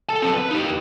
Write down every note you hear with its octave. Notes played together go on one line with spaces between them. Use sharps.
A4 A5
C4 A4
B4
D#4 G4